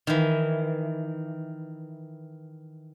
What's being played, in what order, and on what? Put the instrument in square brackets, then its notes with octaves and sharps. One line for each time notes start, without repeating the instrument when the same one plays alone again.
[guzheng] D#3 E3